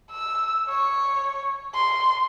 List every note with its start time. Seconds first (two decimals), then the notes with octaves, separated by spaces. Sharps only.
0.11 E6
0.68 C#5
1.75 C6